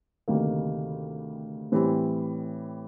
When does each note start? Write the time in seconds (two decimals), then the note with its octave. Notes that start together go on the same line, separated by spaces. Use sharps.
0.28 D2 C3 D#3 G3 A#3
1.72 A2 E3 G3 C4